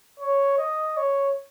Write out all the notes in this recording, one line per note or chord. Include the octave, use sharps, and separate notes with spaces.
C#5
D#5
C#5